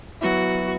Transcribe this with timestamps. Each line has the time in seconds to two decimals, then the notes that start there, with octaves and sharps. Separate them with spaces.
0.21 F#3 B3 E4 F#4